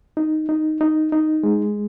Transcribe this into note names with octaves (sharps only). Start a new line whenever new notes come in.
D#4
D#4
D#4
D#4
G#3